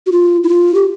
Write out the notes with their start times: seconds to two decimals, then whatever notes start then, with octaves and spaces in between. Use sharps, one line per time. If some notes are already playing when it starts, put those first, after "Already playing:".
0.06 F#4
0.12 F4
0.44 E4
0.49 F4
0.74 G4